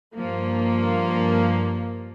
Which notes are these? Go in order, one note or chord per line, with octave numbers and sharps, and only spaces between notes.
G2 F3 A#3